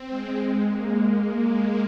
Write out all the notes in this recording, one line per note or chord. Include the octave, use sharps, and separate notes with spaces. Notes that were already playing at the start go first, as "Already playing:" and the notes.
Already playing: C4
G#3
A#3